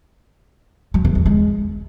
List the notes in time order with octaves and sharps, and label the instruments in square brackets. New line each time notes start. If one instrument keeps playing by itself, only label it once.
[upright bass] F#3
E2
G3
G#3